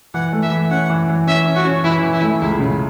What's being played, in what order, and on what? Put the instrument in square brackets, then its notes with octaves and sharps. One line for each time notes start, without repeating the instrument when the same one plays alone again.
[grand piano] E3 [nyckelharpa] F#5
[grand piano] A3
[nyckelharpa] E5
[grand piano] E3
[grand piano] C#4 [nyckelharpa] F#5
[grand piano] E3
E3
[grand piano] C#4 [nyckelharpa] E5
[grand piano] C#4
[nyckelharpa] F#4
[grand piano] C#4
[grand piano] E3 [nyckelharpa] E4
[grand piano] E3
[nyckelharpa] E4
[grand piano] A3
[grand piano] C#2 [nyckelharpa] E4
[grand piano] C#3